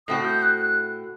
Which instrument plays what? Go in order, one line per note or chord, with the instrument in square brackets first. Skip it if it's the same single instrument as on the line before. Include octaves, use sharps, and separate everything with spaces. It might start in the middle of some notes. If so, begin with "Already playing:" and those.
[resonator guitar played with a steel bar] A2 A3 C4 F#4 [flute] D#6
[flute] G6
F#6
F#6